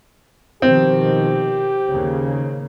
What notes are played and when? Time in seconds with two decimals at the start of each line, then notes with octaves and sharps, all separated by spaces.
0.62 B2 D#3 F3 C4 G4
1.90 D#2 C#3 A#3